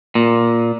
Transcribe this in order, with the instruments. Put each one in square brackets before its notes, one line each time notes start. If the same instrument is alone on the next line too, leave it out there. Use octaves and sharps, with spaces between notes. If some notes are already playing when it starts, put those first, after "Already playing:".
[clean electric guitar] A#2